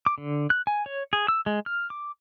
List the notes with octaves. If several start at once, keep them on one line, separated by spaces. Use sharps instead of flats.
D6
D3
F#6
G#5
C#5
G#4
E6
G#3
F6
D6